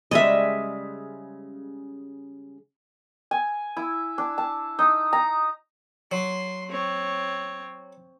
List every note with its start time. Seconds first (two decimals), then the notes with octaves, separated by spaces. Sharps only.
0.11 C#3 G3 G#3 D#5 E5
3.31 G#5
3.77 E4
4.18 D4
4.38 A5
4.79 D#4
5.13 A#5
6.12 F#3 C6
6.69 C4 C#5